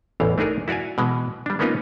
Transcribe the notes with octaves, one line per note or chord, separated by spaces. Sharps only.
A1 E2 E3 F5
A3 D4 D#4 G#4 A#4
E4 F#4 D5 F5 G#5
B2 E3 G#3
G3 D4
G#3 A#3 B3 C#4 D#4 F4